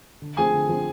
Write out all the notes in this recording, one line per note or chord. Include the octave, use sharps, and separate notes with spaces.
D3
F3 A3 C4 G#4 G#5
D3
F3 A3 C4